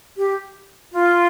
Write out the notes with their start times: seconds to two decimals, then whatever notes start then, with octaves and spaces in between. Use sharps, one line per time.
0.17 G4
0.92 F4